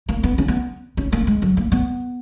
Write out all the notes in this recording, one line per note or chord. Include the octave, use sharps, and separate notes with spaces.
A#3
B3
C#4
B3
C#4
A#3
G#3
F#3
A#3
B3